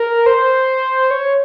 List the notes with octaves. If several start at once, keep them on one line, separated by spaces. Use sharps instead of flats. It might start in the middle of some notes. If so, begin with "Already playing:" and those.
Already playing: A#4
C5
C#5